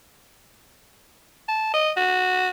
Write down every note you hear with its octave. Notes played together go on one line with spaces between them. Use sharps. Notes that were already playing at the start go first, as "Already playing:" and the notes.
A5
D#5
F#4